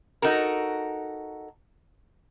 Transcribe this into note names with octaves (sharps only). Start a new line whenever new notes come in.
D#4 F#4 A4 A#4